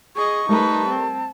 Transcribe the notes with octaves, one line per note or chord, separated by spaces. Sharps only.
G#4 D#5 C#6
G3 A3 D#4 A#4 B4 A5
C4